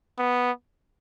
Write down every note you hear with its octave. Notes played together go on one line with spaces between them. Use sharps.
B3